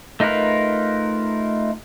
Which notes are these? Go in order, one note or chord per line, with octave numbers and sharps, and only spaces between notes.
A3 D#4 F4 A#4 B4